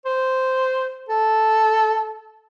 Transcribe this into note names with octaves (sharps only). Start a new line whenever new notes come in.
C5
A4